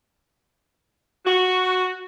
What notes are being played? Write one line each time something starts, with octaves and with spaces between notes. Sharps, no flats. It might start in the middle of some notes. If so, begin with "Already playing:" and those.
F#4